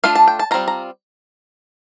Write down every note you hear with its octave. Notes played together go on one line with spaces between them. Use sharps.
A3 D4 F4 F5
A5
G5
A5
G3 C4 F4 A#5
A#5